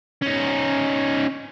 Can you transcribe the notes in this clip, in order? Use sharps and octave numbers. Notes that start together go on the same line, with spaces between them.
C#4 D#4